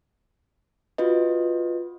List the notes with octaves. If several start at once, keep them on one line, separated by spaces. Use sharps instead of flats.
F4 F#4 B4 D#5